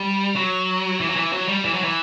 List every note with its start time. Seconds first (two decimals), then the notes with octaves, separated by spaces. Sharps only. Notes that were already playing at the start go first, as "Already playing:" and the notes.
Already playing: G3
0.36 F#3
1.00 E3
1.10 F#3
1.16 E3
1.33 F#3
1.48 G3
1.65 E3
1.74 F#3
1.84 E3